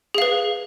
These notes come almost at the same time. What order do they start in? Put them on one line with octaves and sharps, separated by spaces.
G#4 F5 B4